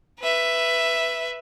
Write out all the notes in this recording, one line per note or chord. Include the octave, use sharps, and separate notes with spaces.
B4 E5